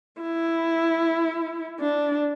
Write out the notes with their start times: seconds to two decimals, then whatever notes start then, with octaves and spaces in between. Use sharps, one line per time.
0.22 E4
1.80 D4